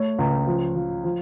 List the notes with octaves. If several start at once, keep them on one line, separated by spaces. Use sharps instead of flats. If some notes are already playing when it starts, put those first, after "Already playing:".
Already playing: A3 C#5
C#2
F3
F3
F3